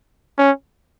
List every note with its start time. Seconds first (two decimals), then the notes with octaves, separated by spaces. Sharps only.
0.38 C#4